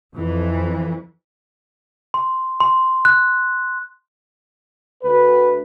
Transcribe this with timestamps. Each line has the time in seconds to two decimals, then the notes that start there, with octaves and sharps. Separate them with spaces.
0.13 F2 E3
2.14 C6
2.60 C6
3.05 F#6
5.03 D2 B4